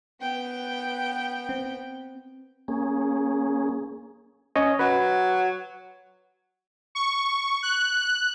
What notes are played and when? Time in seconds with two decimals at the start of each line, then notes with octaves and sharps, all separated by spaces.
0.21 B3 G5
1.49 C4
2.68 A#3 C#4 G#4
4.56 C#4 C#5 D#5
4.79 F#3 B4
6.95 C#6
7.63 F#6